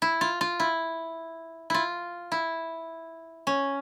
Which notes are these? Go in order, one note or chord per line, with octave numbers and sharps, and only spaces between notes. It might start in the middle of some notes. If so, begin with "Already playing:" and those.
E4
F4
F4
E4
E4 F4
E4
C#4